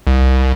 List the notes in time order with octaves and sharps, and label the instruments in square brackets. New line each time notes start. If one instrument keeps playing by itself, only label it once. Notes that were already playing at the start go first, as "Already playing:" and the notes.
[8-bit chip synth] C2